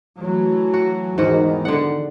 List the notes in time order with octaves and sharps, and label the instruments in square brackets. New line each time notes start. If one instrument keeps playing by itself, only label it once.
[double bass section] E3 F#3 A3
[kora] F#4
[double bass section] E2 D#3 [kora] G#2 F#4
[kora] D3 D4 F#5